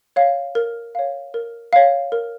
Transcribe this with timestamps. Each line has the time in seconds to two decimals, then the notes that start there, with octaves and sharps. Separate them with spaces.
0.16 C#5 F5
0.55 A#4
0.95 C#5 F5
1.34 A#4
1.73 C#5 F5
2.12 A#4